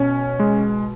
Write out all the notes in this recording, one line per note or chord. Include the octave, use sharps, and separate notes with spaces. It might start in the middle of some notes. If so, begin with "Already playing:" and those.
Already playing: B2 C#4
G#3